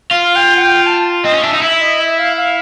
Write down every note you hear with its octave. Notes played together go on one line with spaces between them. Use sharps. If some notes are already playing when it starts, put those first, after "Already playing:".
F4 F5
G5
F#5
G5
A5
C4 D#5
C#4
D4 E5
D#4
E4 E5
D#5
E5
F5
F5